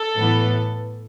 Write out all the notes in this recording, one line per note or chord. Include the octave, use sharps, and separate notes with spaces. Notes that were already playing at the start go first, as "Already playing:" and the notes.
Already playing: A4
A2 E3 B3